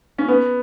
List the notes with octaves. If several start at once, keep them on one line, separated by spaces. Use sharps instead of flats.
C#4
B3